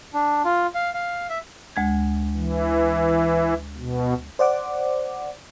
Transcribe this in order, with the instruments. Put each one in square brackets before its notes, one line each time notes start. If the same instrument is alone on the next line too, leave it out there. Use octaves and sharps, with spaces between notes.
[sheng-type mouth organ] D4
F4
F5
F5
E5
[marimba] D2 G#3 G#6
[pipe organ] E3
B2
[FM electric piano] C5 D5 F#5 D6